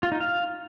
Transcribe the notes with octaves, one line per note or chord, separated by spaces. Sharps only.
F4
D#4
F5